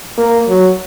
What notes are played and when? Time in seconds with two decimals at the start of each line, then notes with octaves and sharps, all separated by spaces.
0.18 A#3
0.48 F#3